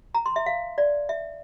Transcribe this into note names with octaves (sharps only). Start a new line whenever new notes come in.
A#5
C6
E5
F5
D5
E5